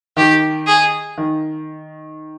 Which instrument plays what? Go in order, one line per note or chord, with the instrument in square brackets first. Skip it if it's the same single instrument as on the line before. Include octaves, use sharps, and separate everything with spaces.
[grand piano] D#3 [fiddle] G4
[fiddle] G#4
[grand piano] D#3